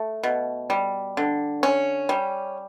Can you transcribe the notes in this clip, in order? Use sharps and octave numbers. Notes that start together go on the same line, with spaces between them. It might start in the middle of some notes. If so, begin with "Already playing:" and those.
Already playing: A3
B2
G3
D3
C#4
G3